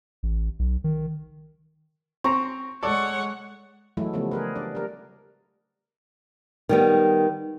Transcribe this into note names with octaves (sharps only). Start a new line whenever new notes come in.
A1
B1
D#3
C4 A#5 C#6
G#3 A4 C#5 D5 F#5
E3 F#3 G#3 A3 E4
C#3 F3 G3 A3 B3
G#4 A#4 B4
D4 D5
G3 A#4
D#3 G3 B3